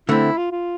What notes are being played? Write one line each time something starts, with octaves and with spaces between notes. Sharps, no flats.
D3 A3 C4 E4
F4
F4